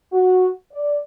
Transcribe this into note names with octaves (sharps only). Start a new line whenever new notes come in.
F#4
D5